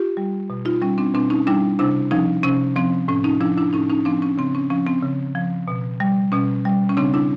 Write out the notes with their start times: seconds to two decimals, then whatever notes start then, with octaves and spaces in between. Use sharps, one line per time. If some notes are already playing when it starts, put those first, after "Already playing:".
Already playing: F4 G4
0.17 G3
0.50 B2
0.65 D#4 F4
0.82 G3 C#4
0.98 C4 D4
1.14 B2 C4 D4
1.30 C#4 D#4
1.47 G3 D4 E4
1.79 C3 D4 E4
2.11 F3 C#4 D#4
2.43 C3 C#4
2.76 F3 C4
3.08 A2 C#4
3.24 C#4 D#4
3.41 F3 D4 E4
3.57 D4 E4
3.73 A2 C#4 D#4
3.90 C#4 D#4
4.05 F3 C4 D4
4.22 C#4
4.38 C#3 C4
4.55 C#4
4.70 F3 C#4
4.87 C4
5.03 C#3
5.35 F3
5.68 B2
6.00 G3
6.32 B2 C#4
6.65 G3
6.89 C#4
6.97 C#3 C4 D4
7.14 D4 E4